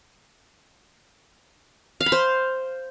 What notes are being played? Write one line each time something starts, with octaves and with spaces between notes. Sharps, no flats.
F5
B5
C5